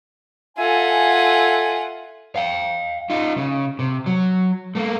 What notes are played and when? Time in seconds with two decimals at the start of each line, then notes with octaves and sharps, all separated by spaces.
0.58 F4 A4 E5 F#5 G#5
2.36 F5 G5
3.10 D#4 F4
3.37 C#3
3.79 C3
4.06 F#3
4.75 A3 A#3